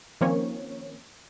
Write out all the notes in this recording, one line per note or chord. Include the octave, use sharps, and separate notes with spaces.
D#3 F3 A#3 C4 C#4 C#5